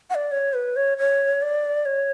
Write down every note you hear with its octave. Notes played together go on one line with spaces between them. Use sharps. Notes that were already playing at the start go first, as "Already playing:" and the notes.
F#5
D5
C#5
B4
C#5
C#5
D5
C#5